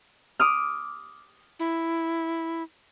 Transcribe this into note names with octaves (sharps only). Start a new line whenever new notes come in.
D6 D#6 F6
E4